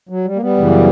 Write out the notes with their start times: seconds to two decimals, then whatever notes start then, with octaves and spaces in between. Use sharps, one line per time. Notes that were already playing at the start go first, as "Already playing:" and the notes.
0.09 F#3
0.25 G3
0.36 A#3
0.40 G3 B3
0.57 F#2 C#3 E3